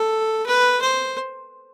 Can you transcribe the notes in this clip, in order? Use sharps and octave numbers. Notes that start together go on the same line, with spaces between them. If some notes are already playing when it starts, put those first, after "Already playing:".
Already playing: A4
B4
C5